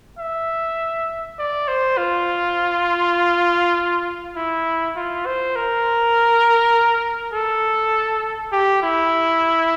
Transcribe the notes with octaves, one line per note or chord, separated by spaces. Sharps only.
E5
D5
C5
F4
E4
F4
C5
A#4
A4
G4
E4